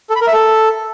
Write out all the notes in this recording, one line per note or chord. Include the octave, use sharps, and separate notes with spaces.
A4
B5
A#4
E5
A4